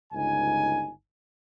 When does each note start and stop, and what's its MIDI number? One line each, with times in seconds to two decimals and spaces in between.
0.13 0.91 31
0.13 0.91 37
0.13 0.91 63
0.13 0.91 80